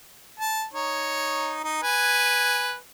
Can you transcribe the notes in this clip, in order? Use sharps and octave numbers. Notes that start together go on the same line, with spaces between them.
A5
D#4 C#5
D#4
B4 G#5